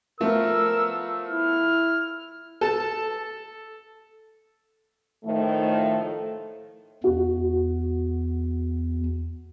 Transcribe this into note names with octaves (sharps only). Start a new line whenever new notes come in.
F3 A3 B3 A#4 E6
E4 F6
A4 A5
A2 D#3 F3 A3
E2 F#4